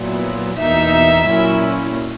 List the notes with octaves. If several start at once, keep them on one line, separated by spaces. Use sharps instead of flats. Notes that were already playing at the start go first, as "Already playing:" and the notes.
Already playing: A#2 F#3 B3 E4
E2 B2 A#3 D#4 E5
A#2 F#3 A#3 C#4 E4